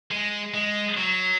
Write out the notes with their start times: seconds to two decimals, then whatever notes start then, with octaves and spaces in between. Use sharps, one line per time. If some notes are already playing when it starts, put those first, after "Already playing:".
0.11 G#3
0.54 G#3
0.97 F#3